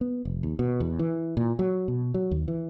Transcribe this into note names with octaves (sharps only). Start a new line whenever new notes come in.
B3
F1
D#2
B2
E2
E3
A#2
F#3
B2
F#3
D#2
E3